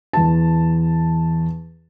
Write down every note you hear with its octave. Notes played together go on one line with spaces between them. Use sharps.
E2 A5